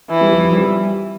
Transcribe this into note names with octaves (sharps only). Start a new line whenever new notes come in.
E3
G3
F3
F3
G3